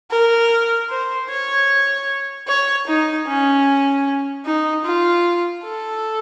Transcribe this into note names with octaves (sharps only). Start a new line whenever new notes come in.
A#4
C5
C#5
C#5
D#4
C#4
D#4
F4
A4